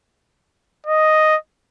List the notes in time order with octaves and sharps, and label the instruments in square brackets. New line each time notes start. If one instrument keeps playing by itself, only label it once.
[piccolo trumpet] D#5